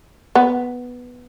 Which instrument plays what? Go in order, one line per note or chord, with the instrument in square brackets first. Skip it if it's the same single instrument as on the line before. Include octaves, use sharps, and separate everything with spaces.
[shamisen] B3